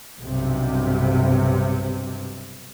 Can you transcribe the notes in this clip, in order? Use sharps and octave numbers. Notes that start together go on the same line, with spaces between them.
B1 G2 C3